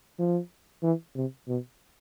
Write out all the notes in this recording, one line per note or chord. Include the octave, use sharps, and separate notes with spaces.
F3
E3
C3
B2